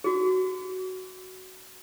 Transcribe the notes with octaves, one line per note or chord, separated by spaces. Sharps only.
F#4 G#4